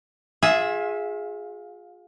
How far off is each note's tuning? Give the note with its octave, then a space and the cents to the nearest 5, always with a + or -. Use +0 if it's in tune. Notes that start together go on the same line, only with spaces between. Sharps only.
F4 +30 G#4 +0 E5 -5